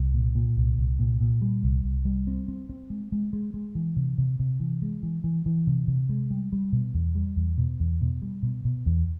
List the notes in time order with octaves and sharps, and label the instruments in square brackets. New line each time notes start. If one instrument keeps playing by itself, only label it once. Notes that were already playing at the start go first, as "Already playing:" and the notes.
Already playing: [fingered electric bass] C2
A#2
A#2
C2
C2
A#2
A#2
G3
C2
C2
G3
C4
C4
C4
G#3
G#3
G#3
G#3
E3
C3
C3
C3
E3
G#3
E3
E3
E3
C3
C3
G#3
G3
G3
B2
E2
G3
E2
B2
E2
B2
G3
B2
B2
E2